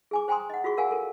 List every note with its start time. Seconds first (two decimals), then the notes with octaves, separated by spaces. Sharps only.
0.11 G#4 G#5 D6
0.28 C5 G5 G#5 A#5 C6 D#6
0.50 D#5 F#5
0.64 F4 F#4 G#4 C#6
0.78 A#4 D5 F5 F#5 G#5
0.91 A4 A#4